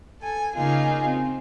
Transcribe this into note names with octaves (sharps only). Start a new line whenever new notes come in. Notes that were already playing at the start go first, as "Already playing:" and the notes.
A4 G#5
C#3 A#3 D#4 F4 G#4
C4